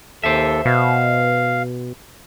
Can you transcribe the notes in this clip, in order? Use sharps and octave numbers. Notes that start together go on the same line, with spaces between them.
D#2 A4 C5 E5
B2 F5